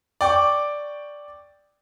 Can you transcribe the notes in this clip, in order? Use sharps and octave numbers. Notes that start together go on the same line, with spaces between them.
D5 G5 C#6 D6